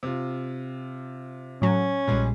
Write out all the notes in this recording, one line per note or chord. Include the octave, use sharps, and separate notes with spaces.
C3 F4
A2 F#3 C#4
A#1 A#2 G3 G#3 G#4